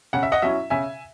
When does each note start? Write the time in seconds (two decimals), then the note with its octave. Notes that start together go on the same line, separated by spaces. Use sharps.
0.13 C#3 F#5
0.23 E5
0.32 D#5 F#5
0.42 F#3 C#4 E4 E5
0.70 C#3 E5 G#5